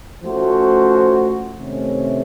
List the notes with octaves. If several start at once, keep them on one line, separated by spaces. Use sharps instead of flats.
F3 A3 C#4 F#4 C5
C3 D#3 A3 C#4